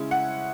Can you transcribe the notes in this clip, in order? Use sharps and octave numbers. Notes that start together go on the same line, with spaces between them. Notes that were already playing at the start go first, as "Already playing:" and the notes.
Already playing: C#3 G#3 C#4 E4
F#5